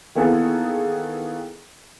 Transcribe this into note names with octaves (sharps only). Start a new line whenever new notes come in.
D#3 E3 A#3 B3 G#4 A4